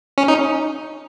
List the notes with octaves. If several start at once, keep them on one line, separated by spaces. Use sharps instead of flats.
C#4
D#4